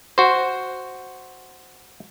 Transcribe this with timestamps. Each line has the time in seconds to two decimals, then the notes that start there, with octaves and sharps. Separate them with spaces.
0.18 F#4 C5